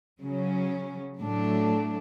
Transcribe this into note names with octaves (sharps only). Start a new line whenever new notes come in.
C#3 F#3 C#4
A2 F#3 A3 D4